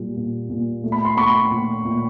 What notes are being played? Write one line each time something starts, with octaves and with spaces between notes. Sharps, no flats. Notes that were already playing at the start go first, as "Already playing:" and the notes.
Already playing: A#2 G3
A#2
A#2
A3
B5
C6
A3 B5 C#6
A#2
A#2